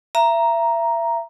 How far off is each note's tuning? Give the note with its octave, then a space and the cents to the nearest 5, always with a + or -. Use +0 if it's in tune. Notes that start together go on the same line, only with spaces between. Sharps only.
E5 +30 A#5 +5